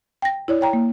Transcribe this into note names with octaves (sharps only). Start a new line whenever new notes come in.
G5 A#6
E4 C#5 D5
C#5 G5 A#5
A#3